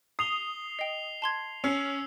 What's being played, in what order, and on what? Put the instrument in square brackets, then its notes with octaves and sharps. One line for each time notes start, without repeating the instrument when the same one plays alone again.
[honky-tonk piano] D#6 [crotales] C7 F7 G7
[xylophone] D#5 G5 [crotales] C7
[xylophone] A5 C6 G#6
[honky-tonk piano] C#4 [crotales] E6 C7